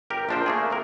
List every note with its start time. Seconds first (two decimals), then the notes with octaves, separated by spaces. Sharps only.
0.10 G1 G4 A#4
0.29 A#1 F3 D4 A#4 C5
0.46 A3 A#3 G#4
0.70 D2 C3 A#4